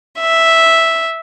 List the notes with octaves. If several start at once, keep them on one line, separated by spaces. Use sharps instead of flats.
E5